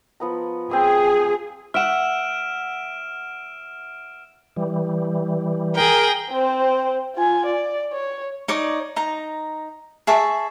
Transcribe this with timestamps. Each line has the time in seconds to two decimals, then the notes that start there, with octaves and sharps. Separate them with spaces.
0.20 F3 B3 A#5
0.71 C4 G#4 D#6
1.74 E5 F#5 F6 D7 E7
4.56 E3 G3
5.76 G#4 A#4 G5
6.31 C4 C5
7.15 F4 G#5
7.45 D5
7.93 C#5
8.48 D#4 C#5 D5 D6
8.96 D#4 A#5
10.07 G#4 E5 A5 C#6